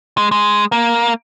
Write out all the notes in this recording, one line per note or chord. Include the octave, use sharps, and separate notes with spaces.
G#3
G#3
A#3